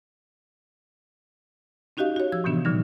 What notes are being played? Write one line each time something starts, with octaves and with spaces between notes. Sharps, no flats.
C#4 D#4 F#4 G4 D#5 F5
F#4 C#5
F3 E6
A2 C3 E3 B3 D4
A#2 D3 F3 G3 D#4